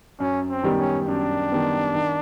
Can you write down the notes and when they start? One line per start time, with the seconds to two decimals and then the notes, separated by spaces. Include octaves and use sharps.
0.20 F#2 C#4
0.50 C4
0.64 D#3 G3 B3
0.78 C#4
1.08 F#2 D4
1.52 D#3 G3 B3
1.95 D#3